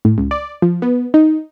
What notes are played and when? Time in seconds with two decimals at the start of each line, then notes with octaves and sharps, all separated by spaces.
0.05 A2
0.18 C#2
0.31 D5
0.62 F3
0.82 B3
1.14 D#4